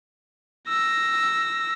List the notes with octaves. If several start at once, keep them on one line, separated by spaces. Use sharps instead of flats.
E6 A#6